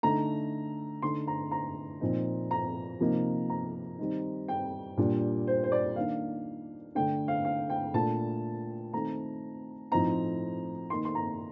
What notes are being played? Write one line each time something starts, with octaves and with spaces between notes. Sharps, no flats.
D3 A3 D#4 A#5
D3 A3 D#4 C6
A#5
A#5
A#2 F3 C4 D#4
A#5
C3 F3 A#3 D#4
A#5
D#3 G3 C4 D#4
G5
A#2 G3 D4
C5
C5
D5
D#3 A#3 D4 F5
D3 A3 D4 G5
F5
F5
G5
A#2 A3 D4 A5
D#3 A3 C4 A#5
A2 F3 C4 D#4 A#5
D#3 A#3 D#4 C6
C6
A#5